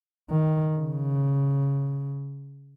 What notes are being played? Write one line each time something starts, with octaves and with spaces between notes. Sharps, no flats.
D#3
C#3